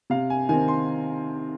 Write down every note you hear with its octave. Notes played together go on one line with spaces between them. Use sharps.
C3 F5
G#5
D#3 C4 G#5
C6